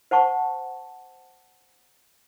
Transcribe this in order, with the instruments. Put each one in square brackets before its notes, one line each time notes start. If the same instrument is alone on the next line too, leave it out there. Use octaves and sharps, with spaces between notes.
[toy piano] C5 F#5 A5 C#6